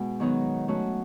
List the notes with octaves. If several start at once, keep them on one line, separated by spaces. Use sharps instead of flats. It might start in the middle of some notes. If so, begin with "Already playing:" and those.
Already playing: B2 G#3 F#4
D#3 F#3 B3 D#4
F#3 A3 C#4 F#4